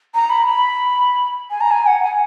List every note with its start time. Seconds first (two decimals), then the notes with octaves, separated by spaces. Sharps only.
0.15 A#5
0.30 B5
0.46 B5
1.50 G#5
1.61 A#5
1.71 G#5
1.87 F#5
2.03 G#5